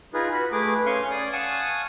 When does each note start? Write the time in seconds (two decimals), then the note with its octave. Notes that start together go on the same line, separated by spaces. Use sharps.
0.14 D#4 F4 G#4 B4
0.33 F#4 B5
0.52 A3 G#4 B4 D6
0.86 C#4 F5 G#5 C6 C#6
1.11 D5 D#6
1.32 F5 F#5 G#5 A5 C#6 D#6